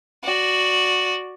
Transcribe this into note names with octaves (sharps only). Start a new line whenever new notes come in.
F#4 D5